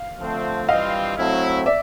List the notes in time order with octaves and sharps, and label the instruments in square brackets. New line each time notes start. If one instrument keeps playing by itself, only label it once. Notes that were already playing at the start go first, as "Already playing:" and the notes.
Already playing: [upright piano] F5
[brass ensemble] D3 F3 A3 C4
[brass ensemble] G2 E3 G3 C4 F4 [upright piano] D#5 F5
[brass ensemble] F#3 A3 C4 E4
[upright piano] D5 E5